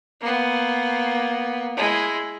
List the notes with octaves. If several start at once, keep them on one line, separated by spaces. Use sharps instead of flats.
A#3 B3
G#3 E4